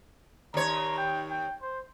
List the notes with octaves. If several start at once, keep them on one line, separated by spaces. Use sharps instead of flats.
D#2 C#5 A#5
G5
G5
C5